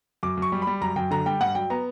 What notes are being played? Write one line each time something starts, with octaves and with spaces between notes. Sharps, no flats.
F#2 D6
F#2 C#6
G3
B5
G3
F#2 A#5
F#2 G5
D3 A#5
G3 G5
G2 F#5
F#3 G5
B3 A#5